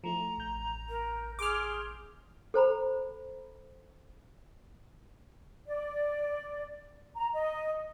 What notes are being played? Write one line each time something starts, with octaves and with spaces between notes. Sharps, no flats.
F3 A3 E4 A#5
A1 G6
A#4
G#4 C6 D6 F6
A4 C5 A#5 B5
D5
A#5
D#5